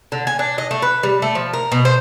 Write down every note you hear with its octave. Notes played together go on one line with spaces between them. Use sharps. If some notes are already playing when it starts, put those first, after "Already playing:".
D3
G#5
D4
D#5
A3
B4
G3
A3
F3
A#4
B2
C5